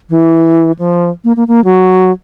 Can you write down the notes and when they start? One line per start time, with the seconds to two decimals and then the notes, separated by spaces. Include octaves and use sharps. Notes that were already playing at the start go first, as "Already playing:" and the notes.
0.10 E3
0.79 F3
1.24 A#3
1.36 A#3
1.48 A#3
1.65 F#3